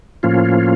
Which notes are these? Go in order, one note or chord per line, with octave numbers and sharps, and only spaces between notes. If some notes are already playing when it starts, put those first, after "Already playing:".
A2 F3 A#3 C#4 F4